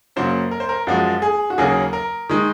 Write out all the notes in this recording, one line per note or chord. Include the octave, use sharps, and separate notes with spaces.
F#2 C#3 F#3 A#3 C5
A#4
C5
A#4
F#2 F3 G#3 F#4
G#4
F#4
D#2 C#3 F#3 A#3 G#4
A#4
D#3 G#3